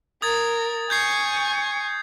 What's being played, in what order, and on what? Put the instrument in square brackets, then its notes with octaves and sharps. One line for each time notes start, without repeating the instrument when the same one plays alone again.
[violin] A#4 [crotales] D#6 G#6 A6
[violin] G#5 C#6 [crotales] G6 G#6 C7